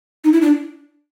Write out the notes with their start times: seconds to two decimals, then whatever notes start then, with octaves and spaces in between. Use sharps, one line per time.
0.24 D#4
0.33 E4
0.42 D4